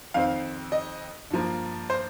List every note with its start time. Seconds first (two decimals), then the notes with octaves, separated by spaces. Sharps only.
0.14 F2 D#3 C4 F5
0.72 D#5
1.30 G2 F3 A#3
1.90 C5